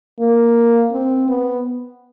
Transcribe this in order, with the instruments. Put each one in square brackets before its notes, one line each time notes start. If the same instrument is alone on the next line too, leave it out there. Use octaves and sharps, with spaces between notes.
[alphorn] A#3
C4
B3